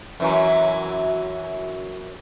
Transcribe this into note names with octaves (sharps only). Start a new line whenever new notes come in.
F#2 E3 F#3